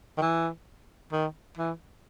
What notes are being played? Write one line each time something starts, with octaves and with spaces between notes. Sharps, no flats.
D#3
E3
D#3
E3